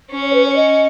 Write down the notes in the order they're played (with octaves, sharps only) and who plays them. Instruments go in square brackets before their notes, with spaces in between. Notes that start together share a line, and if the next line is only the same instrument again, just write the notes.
[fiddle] C#4
[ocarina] C#5
B4
C#5
D#5